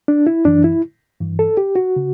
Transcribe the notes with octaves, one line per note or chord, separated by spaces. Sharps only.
D4
E4
F#2 E3 D4
E4
G2 E3
A4
G4
F#4
C#3